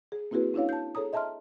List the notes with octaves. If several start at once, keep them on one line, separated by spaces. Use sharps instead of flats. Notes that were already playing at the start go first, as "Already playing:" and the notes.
G#4
A#3 C4 E4 F#4 G#4 B4
C#4 D4 E4 C#5 F5
A5 G6
G#4 A4 C#5 A#5 D#6
D#5 E5 A5 A#5 C6 F6